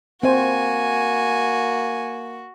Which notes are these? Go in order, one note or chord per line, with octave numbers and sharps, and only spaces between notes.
A#3 C4 F#4 C5 G#5